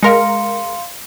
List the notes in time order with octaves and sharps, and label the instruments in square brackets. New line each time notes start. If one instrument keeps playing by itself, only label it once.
[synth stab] G#3 A#4 [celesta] F5 C6 C#7